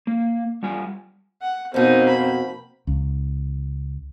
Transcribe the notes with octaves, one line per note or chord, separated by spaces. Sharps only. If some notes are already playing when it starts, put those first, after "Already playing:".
A#3
G3 F4 G#5
F#5
F2 B2 A#3 C4 D#4
B5
C#2